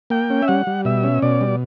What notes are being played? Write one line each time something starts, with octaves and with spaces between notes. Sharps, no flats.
A#3 G5
C#4
E5
G3 F#5
G3
B2 E5
C#4
B2 D5
G3